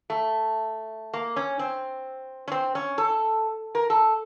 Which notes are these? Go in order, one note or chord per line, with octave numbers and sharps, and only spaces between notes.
A3
A#3
C#4
C4
C#4
C4
C#4
A4
A#4
A4